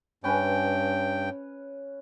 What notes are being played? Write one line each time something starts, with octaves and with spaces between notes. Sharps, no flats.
G2 C#4 B4 G5